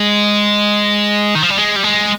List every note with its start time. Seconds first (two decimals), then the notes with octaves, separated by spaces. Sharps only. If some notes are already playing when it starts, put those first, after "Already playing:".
Already playing: G#3
1.35 D#3
1.43 F3
1.50 G3
1.57 G#3
1.76 G3
1.83 G#3